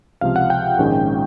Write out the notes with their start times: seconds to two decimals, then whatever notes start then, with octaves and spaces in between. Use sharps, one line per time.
0.21 C#2 C3 F3 F5
0.36 F#5
0.50 G5
0.78 A#1 G#2 D#3 G#3 C#4